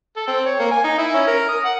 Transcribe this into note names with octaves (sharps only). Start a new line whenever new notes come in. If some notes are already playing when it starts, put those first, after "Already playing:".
A4
C4
C#5
A#3
G#5
D#4
E4
C#4
A#4
D#6
F#5